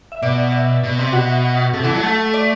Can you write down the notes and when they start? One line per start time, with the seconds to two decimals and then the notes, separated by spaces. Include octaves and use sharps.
0.12 E5
0.22 B2 D5
0.52 E5
0.84 B2
0.98 C3
1.13 B2 F#4 F#5
1.74 C3 A4 A5
1.84 E3
1.94 F#3
2.03 A3 A4 A5
2.34 D5